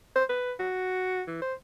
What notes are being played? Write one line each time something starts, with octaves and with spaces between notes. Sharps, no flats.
C5
B4
F#4
E3
C5